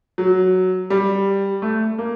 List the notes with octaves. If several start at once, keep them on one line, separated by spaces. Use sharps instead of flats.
F#3
G3
A3
A#3